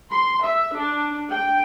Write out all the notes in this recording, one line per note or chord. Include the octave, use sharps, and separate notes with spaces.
C6
E5
D4
G5